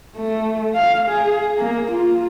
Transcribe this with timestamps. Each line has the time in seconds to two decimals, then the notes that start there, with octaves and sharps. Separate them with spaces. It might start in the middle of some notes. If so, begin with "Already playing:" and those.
0.17 A3
0.75 F5
1.09 G#4
1.58 A#3
1.91 F4